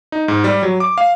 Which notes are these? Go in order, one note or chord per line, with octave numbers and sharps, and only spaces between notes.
D#4
G#2
G3
F#3
D6
F5